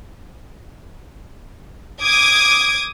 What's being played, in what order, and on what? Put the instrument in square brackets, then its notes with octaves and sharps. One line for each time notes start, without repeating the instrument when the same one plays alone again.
[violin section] D6 D#6 G#6